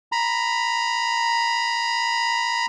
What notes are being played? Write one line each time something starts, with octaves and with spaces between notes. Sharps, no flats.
A#5 B5